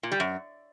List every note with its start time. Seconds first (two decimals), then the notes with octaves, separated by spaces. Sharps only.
0.03 A#2
0.12 G3
0.20 F#2